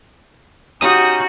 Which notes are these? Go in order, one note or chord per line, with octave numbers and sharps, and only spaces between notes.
C#4 D#4 F#4 G4 D#6